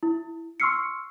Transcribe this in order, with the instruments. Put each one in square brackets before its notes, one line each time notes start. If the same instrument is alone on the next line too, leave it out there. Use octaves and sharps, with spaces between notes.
[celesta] E4
C6 C#6 E6 F6 C7 C#7